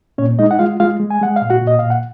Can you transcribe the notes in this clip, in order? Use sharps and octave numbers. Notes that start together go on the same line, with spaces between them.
A#2 C#4 C#5
G#3 D#4 D#5
F#5
G#3 F4 F5
G#3 F4 F5
G#3
G#5
G#3 F#5
F5
A#2
F#4 F#5
A#2
D#5
A#2 F5
F#5